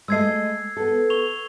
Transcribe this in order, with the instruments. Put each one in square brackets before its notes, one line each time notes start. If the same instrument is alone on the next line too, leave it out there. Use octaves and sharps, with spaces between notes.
[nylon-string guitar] G#3 A3 D#5 [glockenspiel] E6 G#6 C7
[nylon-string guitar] B3 A4
[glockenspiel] C#6 F7 G7